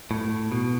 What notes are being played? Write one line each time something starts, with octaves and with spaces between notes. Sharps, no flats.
A2
B2